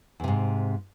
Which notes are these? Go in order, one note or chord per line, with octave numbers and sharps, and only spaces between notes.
E2 G#2 C3